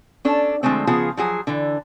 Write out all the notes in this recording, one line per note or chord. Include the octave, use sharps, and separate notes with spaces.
C#4 D4 A4
D3 F3 G#3 A3 C4
C#3 F3 B3 F4 G#4
F3 F#3 G#4
D3 E3